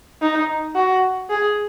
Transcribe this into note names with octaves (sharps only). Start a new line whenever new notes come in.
D#4
F#4
G#4